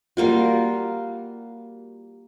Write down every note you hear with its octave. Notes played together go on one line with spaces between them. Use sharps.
G3 A#3 F4 F#4